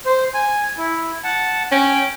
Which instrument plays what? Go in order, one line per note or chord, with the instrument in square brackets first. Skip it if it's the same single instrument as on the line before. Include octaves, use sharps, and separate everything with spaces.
[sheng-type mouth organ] C5
G#5
E4
F#5 A5
[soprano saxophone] C#4 [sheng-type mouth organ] G5